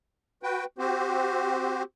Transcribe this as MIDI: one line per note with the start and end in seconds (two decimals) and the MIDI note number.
0.43 0.65 66
0.43 0.65 71
0.43 0.65 79
0.78 1.83 60
0.78 1.83 66
0.78 1.83 67
0.78 1.83 72